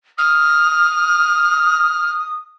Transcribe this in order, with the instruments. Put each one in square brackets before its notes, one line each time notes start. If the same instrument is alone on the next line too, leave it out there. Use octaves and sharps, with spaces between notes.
[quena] D#6 [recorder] F6